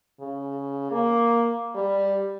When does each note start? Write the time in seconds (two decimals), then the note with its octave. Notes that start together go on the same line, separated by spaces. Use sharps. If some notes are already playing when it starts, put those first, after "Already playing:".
0.20 C#3
0.91 A#3
1.75 G3